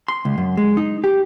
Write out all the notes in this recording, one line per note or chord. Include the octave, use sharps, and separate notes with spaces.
C6
C#2
F#2
G#3
D#4
G4